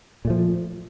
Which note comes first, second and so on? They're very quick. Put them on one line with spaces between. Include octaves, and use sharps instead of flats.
A#2 A3 F3